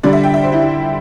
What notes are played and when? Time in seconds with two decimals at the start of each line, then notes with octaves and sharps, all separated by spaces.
0.03 D3 G3 D5
0.13 E5
0.24 G5
0.34 E5
0.43 C5
0.52 E4
0.63 E4